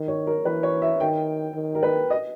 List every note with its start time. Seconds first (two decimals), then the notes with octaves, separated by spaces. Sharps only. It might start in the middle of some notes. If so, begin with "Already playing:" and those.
Already playing: D#3
0.08 C#5
0.27 A#4
0.45 E3 B4
0.63 C#5
0.82 E5
1.00 D#3 G5
1.55 D#3
1.75 A#4
1.83 B4
2.10 D#5